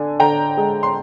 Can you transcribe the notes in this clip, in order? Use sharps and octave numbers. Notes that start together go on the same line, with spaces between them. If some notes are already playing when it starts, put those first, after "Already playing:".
Already playing: D3 D4 G#5
D3 G5 A#5
G#3
C6